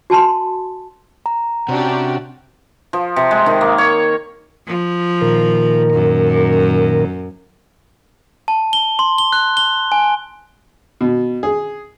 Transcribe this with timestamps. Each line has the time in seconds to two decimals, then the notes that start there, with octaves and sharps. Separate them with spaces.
0.10 F#4 G#5 A5 B5 C6
1.26 A#5
1.69 C3 C#4 D4 F#4 G4
2.93 F3
3.16 C3
3.31 G#3
3.46 D#3
3.61 A#3
3.78 C#5
4.67 F3
5.21 A#2 D#3 A#4
5.93 F#2
8.48 A5
8.73 G7
8.99 C6
9.18 G7
9.33 F#6
9.57 G7
9.92 G#5
11.01 B2
11.43 G#4